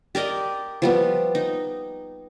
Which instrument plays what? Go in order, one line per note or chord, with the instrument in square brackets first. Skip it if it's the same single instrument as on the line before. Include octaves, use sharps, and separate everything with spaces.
[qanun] G4 A#4 D5 D#5
F3 G3 B3
D#4